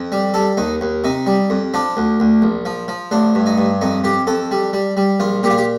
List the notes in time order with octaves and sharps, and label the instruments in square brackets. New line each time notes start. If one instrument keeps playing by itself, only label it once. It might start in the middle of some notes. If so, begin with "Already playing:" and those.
Already playing: [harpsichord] F2
G3
G3 A4
D#2 D#4
D#2
C3 D#4
G3
F2
F3 D4
D2
D2
A#1
F3
F3
A1 D4
G2
D#4
G2
F2 D#4
F2 G4
F2 A4
G3
G3
G3
A#1 F4
A#2 G4
F4
G4